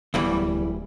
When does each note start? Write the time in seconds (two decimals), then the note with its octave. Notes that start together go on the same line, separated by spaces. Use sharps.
0.14 D1 E2 E3 G3